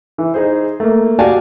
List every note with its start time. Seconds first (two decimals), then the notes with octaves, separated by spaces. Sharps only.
0.18 E3
0.34 D#4 G#4 C5
0.80 A3 A#3
1.19 F#4 G4 D5 F5 G#5 A5